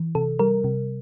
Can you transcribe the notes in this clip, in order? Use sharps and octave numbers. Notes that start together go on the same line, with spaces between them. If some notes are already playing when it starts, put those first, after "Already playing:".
Already playing: E3
C3 A4
G3 A#4
C3